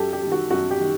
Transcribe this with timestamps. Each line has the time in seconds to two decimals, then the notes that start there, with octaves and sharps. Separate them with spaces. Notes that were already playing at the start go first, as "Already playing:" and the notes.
Already playing: F#2 G4 A4
0.13 G4
0.22 G3
0.27 D#3 F#4
0.51 F#2 F#4
0.71 G4
0.80 D#3 G3